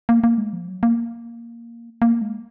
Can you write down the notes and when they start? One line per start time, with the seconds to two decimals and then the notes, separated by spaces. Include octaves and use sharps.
0.09 A#3
0.24 A#3
0.38 G#3
0.53 F3
0.68 F#3
0.83 A#3
2.02 A#3
2.21 G#3